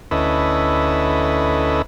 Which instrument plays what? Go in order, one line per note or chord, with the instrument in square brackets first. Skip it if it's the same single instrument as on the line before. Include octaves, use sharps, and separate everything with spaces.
[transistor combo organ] D2 C#4 E4 A4 B4 D#5